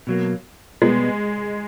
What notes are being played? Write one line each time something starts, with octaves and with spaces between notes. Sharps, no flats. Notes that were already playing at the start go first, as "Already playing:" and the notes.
B2 F#3 A#3
B2 G3 G#3 B3